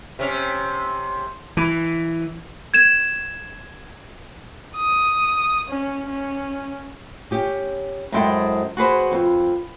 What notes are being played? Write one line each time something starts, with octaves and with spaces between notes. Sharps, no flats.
C3 C#4
E3
G#6 E7
D#6
C#4
C#4
C#4 G4
F#2 G#3 E4 A4 C5 G5
F#4 G#4 B4 C5
F2